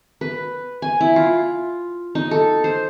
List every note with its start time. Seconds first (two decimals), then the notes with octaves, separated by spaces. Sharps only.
0.21 B4
0.82 G#5
1.01 E4
1.16 F4
2.15 D#4
2.31 A4
2.64 C5